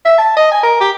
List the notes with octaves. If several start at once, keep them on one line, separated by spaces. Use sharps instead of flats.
E5
A5
D#5
G#5
A#4
G4